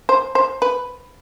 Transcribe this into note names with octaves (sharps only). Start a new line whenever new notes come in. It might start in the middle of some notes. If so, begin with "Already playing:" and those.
C5
C5
B4